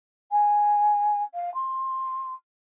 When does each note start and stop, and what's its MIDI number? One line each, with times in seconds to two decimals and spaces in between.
0.31 1.22 80
1.34 1.53 77
1.54 2.33 84